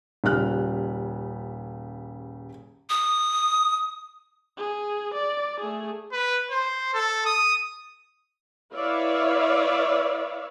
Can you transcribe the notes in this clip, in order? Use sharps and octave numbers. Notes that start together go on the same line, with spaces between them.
D#1 C#3 G3 F6 F#6
D#6
G#4
D5
A3 G#4
B4
C5
A4
D#6
E4 B4 C#5 D5 E5 F5